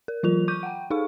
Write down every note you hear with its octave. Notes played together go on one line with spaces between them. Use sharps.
A#4
E3 F#3 F4 A#4 F7
C#6 D6 G6 D#7
F#5 G5
D#4 G#4 A4 F5 C#6